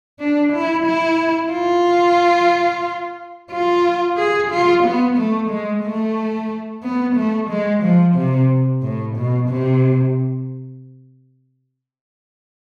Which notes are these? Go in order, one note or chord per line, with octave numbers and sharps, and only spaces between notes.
D4
E4
E4
F4
F4
G#4
F4
B3
A3
G#3
A3
B3
A3
G#3
F3
C3
A2
B2
C3